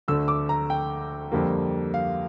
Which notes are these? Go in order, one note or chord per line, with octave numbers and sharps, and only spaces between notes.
D2 D3 A3 E6
D6
A#5
G5
F2 D3 G3 A#3
F5